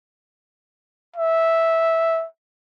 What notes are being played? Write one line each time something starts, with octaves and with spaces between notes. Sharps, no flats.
E5